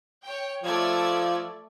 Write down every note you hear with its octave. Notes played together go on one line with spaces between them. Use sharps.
C#5 G5
F3 A3 D5 G#6